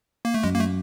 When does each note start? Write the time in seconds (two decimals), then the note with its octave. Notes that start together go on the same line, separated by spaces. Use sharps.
0.25 A#3
0.34 A3
0.43 F#2 G#3
0.55 A#3
0.59 A3